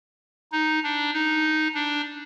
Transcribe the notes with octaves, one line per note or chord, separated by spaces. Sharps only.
D#4
D4
D#4
D4